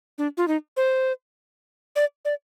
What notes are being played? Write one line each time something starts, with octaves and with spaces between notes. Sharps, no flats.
D4
F4
D#4
C5
D5
D5